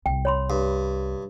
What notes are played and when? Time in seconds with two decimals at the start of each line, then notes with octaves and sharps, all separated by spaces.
0.06 C2 G5
0.25 C#5 B5 C6
0.50 G2